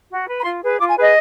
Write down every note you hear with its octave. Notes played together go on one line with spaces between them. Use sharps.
F#4
B4
B5
F4 C6
G#4 B4
F4 D6
G#5
G#4 B4 D#5